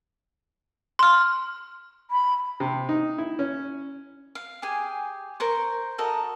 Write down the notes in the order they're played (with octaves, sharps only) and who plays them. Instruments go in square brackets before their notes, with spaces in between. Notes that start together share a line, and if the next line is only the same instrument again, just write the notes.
[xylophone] C6 F6
[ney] B5
[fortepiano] C3
D#4
E4
C#4
[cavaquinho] F5
G4 G#4 G#5
A#4 C5 C#6
F#4 A4 A#4 D#5